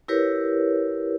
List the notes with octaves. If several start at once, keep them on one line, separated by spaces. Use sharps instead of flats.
E4 G4 A#4 B4 C#5